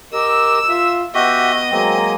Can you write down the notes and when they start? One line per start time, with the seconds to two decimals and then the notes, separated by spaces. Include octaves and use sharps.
0.13 G4 A#4 D#5 E6
0.69 F4 E5
1.15 B3 F#4 G4 D#5 E5
1.71 F#3 G#3 A#3 C4